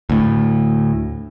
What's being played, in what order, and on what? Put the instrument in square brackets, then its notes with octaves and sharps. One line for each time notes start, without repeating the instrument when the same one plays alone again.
[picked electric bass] D2 A2